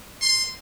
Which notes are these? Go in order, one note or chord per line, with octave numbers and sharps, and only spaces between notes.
C6